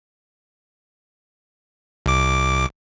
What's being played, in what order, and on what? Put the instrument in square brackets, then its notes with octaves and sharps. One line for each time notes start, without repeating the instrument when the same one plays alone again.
[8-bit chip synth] C2 D6